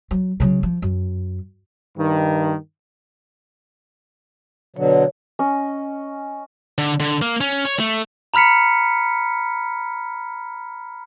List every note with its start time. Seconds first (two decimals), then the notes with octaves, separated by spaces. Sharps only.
0.11 F#3
0.40 C#3 F#3
0.63 F3
0.82 F#2
1.97 G2 D#3
4.76 B2 D3 F#3 C#5
5.39 C#4 D#5
6.78 D3
7.00 D3
7.22 A#3
7.41 C#4
7.65 C#5
7.80 A3
8.34 A#5 B5 F6 B6 C#7